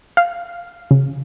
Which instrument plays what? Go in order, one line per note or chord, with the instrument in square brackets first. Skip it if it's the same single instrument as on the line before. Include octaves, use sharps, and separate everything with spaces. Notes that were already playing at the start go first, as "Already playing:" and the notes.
[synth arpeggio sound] F5
C#3